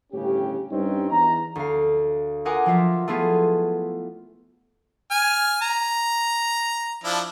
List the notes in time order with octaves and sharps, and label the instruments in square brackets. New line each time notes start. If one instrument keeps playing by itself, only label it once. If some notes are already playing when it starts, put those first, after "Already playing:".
[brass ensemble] G1 A2 C#3 C#4 G4
G2 G3 C4 C#4 D#4
E2 A#5
[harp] D2 F5
F4 A#4 F#5 G#5 D6 D#6
F3 F#3 F4 E5
A3 B3 E4 F4 G#4
[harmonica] G#5 F6
A#5
F3 D4 E4